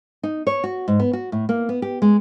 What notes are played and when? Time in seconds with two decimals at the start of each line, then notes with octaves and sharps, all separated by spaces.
0.23 D#4
0.47 C#5
0.64 F#4
0.88 G#2
1.00 B3
1.13 F#4
1.32 A2
1.49 A#3
1.69 B3
1.82 G4
2.02 G#3